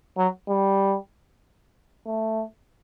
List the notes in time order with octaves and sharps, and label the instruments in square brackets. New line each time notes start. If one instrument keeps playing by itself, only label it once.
[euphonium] F#3
G3
A3